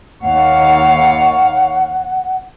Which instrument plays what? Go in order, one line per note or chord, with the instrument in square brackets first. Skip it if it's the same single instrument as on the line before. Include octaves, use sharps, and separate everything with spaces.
[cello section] D#2 C#5 F5 [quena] F#5